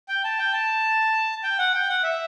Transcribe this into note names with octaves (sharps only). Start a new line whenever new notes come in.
G5
A5
G5
A5
G5
F#5
G5
F#5
E5